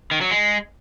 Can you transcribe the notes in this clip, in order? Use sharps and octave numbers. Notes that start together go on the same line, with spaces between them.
D#3
F#3
G#3